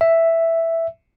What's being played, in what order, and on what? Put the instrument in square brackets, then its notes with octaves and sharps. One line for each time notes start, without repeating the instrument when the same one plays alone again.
[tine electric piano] E5